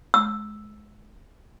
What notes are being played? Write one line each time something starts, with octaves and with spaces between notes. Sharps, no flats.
E6